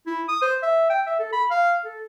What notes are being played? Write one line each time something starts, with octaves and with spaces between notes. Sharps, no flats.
E4
D#6
C5
E5
G5
E5
A4
B5
F5
A4